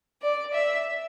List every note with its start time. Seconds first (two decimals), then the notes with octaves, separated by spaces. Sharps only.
0.22 D5
0.55 E5